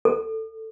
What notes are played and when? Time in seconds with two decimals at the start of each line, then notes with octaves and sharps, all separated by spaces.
0.05 A4